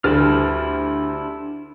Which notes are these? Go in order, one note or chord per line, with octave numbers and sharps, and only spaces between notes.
D2 G3 D4 E4 F6 A6